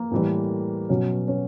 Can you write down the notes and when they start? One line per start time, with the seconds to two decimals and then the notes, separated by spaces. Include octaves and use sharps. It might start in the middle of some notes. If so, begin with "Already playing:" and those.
Already playing: A#3
0.11 A2 E3 G3
0.89 B2 F#3 C#4
1.28 C#4